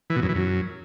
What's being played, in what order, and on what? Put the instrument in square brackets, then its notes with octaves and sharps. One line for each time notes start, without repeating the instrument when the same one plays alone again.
[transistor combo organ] E3
B2
F#2
E3
F#2